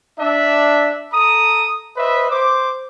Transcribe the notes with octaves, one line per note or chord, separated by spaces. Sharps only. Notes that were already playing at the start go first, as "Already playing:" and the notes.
D4 E5
A4 A#5 D#6
B4 C5 D#5 E5
C5 D6